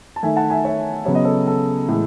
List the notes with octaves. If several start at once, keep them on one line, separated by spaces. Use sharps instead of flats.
A5
D#3 A3 E5 G#5
F#5 A5
E5 G#5
C#5 E5
C#3 F#3 B3 C#5
D#5
A4 C#5
A4
A2 E3 G#3